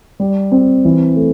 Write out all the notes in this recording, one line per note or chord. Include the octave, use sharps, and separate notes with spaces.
G3
C4
E3
A3